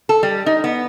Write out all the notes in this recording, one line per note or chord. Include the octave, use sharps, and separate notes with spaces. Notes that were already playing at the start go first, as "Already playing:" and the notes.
A4
G3
D#4
B3